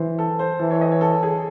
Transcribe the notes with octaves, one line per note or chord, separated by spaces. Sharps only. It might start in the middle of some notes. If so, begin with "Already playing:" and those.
Already playing: E3 C5
A4
C5
E3 A4
C#5
D#5
C#5
A4
G#4